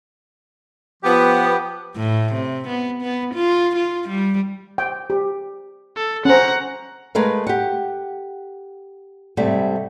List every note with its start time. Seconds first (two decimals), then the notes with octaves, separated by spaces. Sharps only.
1.03 F3 B3 G4
1.96 A2
2.33 C3
2.68 B3
3.02 B3
3.34 F4
3.76 F4
4.09 G3
4.78 G5
5.10 G4
5.96 A4
6.25 C#4 C5 F#5 A#5
7.15 G#3 A3 A#4 B4 D#5 F5
7.47 G4 F#5
9.37 G#2 C3 G3 A3